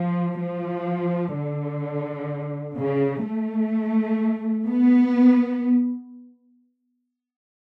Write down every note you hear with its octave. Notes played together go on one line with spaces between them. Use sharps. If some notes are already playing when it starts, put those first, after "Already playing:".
Already playing: F3
F3
D3
C#3
A3
B3